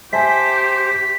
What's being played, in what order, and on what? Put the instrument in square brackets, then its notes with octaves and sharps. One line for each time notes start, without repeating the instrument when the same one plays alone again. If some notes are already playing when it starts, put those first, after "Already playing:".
[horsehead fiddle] G4 [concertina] C5 [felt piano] E5 G#5 A5 [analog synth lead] B6